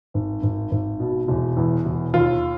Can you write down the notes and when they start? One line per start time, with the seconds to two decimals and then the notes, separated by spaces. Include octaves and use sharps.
0.14 G#1
0.43 G#1
0.71 G#1
1.00 B2
1.28 E1
1.57 E2
1.86 E1
2.14 D#2 F4